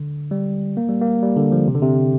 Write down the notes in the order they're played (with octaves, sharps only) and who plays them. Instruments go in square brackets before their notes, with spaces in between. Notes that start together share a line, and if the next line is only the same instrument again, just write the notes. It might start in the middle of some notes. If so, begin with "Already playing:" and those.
Already playing: [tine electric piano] D3
G3
A#3
G3
A#3
G3
D3
F3
C3
D3
C3